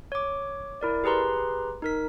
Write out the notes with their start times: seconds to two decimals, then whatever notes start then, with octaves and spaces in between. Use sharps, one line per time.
0.12 C#5 D6
0.81 E4 A#4 D5
1.04 G4 G#4 B4 A#5 C6
1.82 D#4 A#4 B6